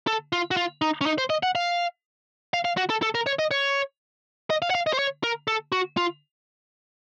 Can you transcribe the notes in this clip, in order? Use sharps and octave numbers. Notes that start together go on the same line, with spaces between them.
A4
F4
F#4
F4
D#4
C#4
D#4
C5
D#5
F#5
F5
F5
F5
F#4
A4
A4
A#4
C#5
D#5
C#5
D#5
F5
F#5
F5
D#5
C5
C#5
A#4
A4
F#4
F4